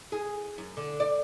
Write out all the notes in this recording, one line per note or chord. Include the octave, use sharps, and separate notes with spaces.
G#4
F#2
D3
D5